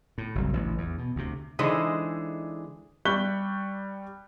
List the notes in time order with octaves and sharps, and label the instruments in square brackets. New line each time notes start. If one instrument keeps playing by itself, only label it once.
[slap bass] A2
F#1 C2
A1 D2
E2
B2
D2 C3
[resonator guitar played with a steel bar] D3 E3 G#3 D#4 G#4 C5
[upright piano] G3 C#6 F#6 G6 B6 G7